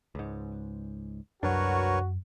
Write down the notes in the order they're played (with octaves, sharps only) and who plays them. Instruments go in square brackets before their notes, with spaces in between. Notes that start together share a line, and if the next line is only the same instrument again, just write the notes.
[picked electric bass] C#2 G#2
[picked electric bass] C2 F#3 D4 [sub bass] F#2 [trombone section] F#4 [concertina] A#4 B4 C#5